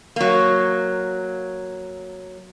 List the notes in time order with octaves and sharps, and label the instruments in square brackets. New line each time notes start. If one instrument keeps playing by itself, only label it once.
[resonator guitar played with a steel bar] F#3 A#3